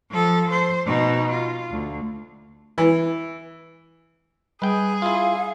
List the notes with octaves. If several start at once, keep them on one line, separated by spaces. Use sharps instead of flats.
F3 A4
C5
B2 D#4
F4
D2
E3
G3 G#4 B4 G5
E4 F4 F5